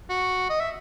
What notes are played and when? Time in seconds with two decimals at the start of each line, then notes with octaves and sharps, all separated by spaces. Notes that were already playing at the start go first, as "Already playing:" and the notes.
0.09 F#4
0.50 D#5
0.60 E5